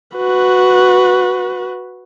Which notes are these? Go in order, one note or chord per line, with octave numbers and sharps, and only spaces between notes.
F#4 B4